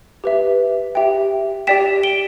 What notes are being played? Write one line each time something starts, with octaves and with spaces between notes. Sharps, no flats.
G4 B4 E5
G4 E5 G5
G4 D5 G5 B6 E7
D7 G7